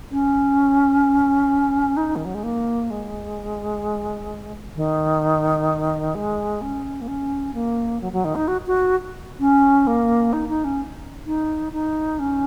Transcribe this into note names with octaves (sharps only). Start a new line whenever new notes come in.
C#4
D#4
D#3
F#3
G#3
A#3
G#3
D#3
G#3
C#4
A#3
C#4
A#3
F#3
F#3
D#3
D#4
F#4
F#4
C#4
A#3
D#4
D#4
C#4
D#4
D#4
C#4